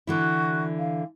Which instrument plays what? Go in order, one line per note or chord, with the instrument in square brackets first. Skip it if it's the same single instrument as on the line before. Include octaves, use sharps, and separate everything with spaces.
[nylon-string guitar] D3 E3 E4 [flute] F#4
[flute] F5